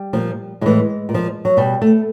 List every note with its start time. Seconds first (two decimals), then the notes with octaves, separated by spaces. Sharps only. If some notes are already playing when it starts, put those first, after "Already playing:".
Already playing: G3
0.13 A#2 F3
0.61 A2 E3 G#3
1.09 A#2
1.14 F3
1.45 F#3
1.57 B2 G3
1.82 A3